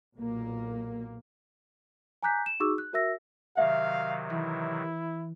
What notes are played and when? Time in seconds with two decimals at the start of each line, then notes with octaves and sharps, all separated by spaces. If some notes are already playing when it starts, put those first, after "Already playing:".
0.16 B1 A#2 A#3
2.23 G#5 A#5 D6 F#6 G6 B6
2.46 E7
2.60 D#4 F#4 G#4 C#6 D6 E6
2.78 F#6
2.93 F#4 A#4 E5 E6 A#6
3.58 C3 D#3 F#3 E5 F5
4.30 E3 E4